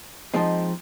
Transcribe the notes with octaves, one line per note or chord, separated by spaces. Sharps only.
F3 G#3 C4 D#4